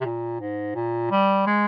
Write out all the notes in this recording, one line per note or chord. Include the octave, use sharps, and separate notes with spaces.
C3
A#2
G#2
A#2
G3
G#3